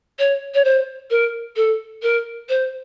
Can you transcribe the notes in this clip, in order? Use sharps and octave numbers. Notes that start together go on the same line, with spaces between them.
C#5
C#5
C5
A#4
A4
A#4
C5